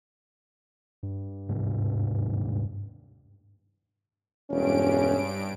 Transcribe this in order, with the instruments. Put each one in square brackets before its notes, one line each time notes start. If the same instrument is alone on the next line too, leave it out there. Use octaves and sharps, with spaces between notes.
[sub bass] G2
[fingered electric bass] D#1 G#2 C3
[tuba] E1 [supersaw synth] G2 D7 [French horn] C#4